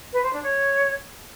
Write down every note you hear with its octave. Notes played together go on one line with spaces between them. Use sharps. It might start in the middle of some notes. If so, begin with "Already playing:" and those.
B4
C5
D4
C#5